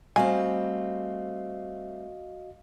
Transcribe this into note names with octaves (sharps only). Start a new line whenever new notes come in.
G3 A3 C4 F#4 D#5 F5 G#5